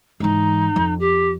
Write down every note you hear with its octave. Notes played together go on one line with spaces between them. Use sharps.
G#2 E3 D#4
F2
G4